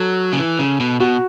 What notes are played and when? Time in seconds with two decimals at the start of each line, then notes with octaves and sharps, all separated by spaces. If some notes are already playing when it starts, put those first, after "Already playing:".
Already playing: F#3 A4
0.33 C#3
0.39 E3
0.59 C#3
0.80 B2
1.00 B2 F#4